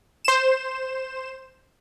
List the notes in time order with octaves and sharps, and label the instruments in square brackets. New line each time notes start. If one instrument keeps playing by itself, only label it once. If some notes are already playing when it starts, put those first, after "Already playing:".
[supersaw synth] C5 E7